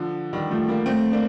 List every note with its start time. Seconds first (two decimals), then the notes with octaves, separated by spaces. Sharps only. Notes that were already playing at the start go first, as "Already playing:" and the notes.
Already playing: D3 F3
0.33 D#3 G3
0.51 F3 A3
0.68 G3 A#3
0.86 A3 C4
1.12 A#3 D4